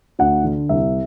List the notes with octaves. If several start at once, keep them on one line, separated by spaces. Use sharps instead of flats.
D2 F#5
D3
C2 E5